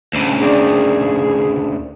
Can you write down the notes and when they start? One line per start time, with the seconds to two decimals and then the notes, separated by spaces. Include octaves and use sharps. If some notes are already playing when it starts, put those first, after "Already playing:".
0.14 D2 C#3
0.41 D#3 C4 D4 G#4